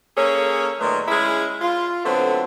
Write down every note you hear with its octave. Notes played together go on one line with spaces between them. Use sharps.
A#3 C#4 G#4 A4 C#5
A#2 D#3 F#3 A3 B3
G#3 C#4 E4 G#4
F4
D3 F#3 A3 B3 C4